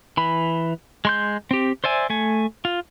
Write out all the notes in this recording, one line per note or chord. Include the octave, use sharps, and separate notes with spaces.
E3 B5
G#3 C6 G6
C4 G4
C5 D5 E5 G#5
A3 G#5
F4